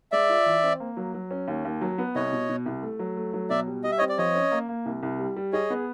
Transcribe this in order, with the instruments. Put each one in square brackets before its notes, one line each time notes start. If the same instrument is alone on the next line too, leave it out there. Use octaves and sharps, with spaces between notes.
[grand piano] G#3 [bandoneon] D5 E5
[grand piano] F4
E3
C4
A#3
F#3
F#3
C#4
D#2
D#2
F#3
B3
[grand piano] C2 [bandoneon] C#5 D#5
[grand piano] B2
B2
C2
A3
F#3
A3
F#3
[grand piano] B2 [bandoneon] D5 E5
[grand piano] G3
[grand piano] G3 [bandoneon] D#5
[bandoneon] E5
[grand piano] C4 [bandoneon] C#5 D#5
[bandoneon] D5
[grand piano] F3 [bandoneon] C#5 D#5
[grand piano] C#4
A#3
A#3
C2
C2
G3
G3
[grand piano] G#4 [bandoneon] C#5 D#5
[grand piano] B3